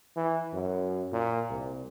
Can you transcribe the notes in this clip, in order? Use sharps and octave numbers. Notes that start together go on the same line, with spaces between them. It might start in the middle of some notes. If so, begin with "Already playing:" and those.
E3
F#2
A#2
C2